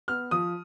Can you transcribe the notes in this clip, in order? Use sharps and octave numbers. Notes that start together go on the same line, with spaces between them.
B3 F6
F3 D#6